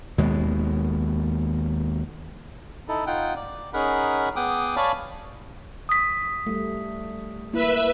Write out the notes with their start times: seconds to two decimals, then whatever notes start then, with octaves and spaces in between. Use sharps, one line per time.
0.18 D#2 B2 G#3
2.88 D#4 E4 A4
3.07 D#4 F4 F#5 G5
3.36 D5
3.74 C#4 D#4 G#4 A#4 F#5 B5
4.36 B3 G#4 F#5 G5 D6 D#6
4.76 C#5 D5 F5 G#5 A5 B5
5.89 D#6 B6
6.47 G3 A3
7.53 A#3 E4 B4 E5